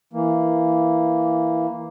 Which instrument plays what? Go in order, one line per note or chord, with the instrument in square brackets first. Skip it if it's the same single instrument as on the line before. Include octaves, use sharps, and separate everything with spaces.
[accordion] E3 A#3